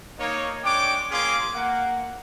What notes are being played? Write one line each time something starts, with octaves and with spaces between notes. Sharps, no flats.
A#3 D#4 C#5
G#3 D4 C#5 G5 D6
A#3 C#4 F4 G#4 C6 D6
A#3 F#5